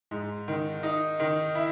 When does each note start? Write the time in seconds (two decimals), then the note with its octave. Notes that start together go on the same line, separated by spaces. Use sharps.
0.11 G#2
0.48 D#3
0.83 D#4
1.20 D#3
1.55 E4